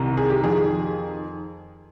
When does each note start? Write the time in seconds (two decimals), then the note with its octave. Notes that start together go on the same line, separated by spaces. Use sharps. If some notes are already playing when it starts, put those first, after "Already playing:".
Already playing: C2 C3 D#3
0.17 G#4
0.29 G4
0.43 F2 D#3 G#4